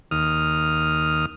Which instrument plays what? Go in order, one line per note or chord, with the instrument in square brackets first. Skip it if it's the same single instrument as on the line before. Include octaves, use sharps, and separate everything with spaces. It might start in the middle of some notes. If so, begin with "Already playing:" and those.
[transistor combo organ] D#2 D#6 F6